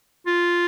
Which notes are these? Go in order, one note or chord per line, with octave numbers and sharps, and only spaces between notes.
F4